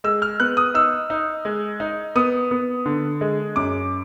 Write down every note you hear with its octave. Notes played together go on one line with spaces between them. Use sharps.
G#3 E6
F6
B3 F#6
D#6
D#4 E6
D#4
G#3
D#4
B3 D#6
B3
D3
G#3
F#2 D6